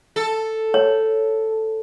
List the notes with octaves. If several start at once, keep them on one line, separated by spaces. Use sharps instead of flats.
A4
C#5